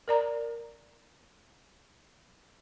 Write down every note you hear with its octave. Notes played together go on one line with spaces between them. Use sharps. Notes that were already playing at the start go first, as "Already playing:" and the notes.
A#4 D5 A#5